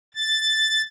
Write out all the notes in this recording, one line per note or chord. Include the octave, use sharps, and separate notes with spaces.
A6